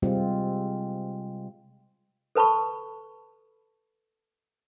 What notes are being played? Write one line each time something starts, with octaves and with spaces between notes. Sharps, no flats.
C3 G3 G#3 C4 F4
A4 B4 A5 B5 C#6